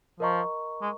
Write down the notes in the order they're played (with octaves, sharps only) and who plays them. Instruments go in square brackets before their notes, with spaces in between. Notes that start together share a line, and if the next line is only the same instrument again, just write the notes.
[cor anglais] F3 [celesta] A#4 D#5 A#5 C#6
[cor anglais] G#3